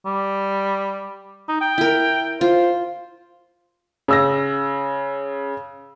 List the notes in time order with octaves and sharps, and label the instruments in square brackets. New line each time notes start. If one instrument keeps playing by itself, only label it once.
[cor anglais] G3
D#4
G5
[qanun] E4 A#4
[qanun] F4 [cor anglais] C5
[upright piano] C#3 E6 A#6